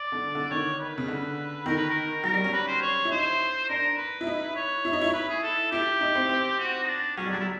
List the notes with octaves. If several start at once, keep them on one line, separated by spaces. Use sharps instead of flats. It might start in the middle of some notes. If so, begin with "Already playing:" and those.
Already playing: D5
D3
D3
D#3 C#5
B4
C#3
D3
D#3 A#4
B4
A#4
F#3 A#4
G3
C#4
B4
C5
C#5
E4
D#4 C5
D4 A#4
B4
E4
D#4
C#5
E4
D#4
E4
B4
G#4
A4
E4 G4
D#4
C4
C4
F#4
D#4
D4
F#3 C#4
G3
F#3 D4
E4